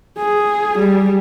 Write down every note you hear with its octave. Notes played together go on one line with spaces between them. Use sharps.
G#4
G3